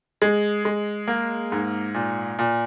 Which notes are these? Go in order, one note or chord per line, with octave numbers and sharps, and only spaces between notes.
G#3
G#3
A#3
G#2
A#2
A#2